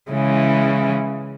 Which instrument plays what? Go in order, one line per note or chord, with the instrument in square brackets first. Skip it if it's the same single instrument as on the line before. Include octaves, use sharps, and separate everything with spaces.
[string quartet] C#3 E3 G#3 C#4 E4